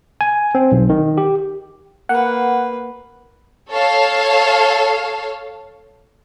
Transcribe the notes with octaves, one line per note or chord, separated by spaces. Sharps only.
G#5
C4
B1
D#3
G4
A#3 B4 F#5
A4 C#5 F5 A5